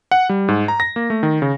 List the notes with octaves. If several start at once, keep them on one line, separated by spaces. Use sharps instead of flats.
F#5
G3
G#2
A#5
A#6
A#3
A3
D#3
C#3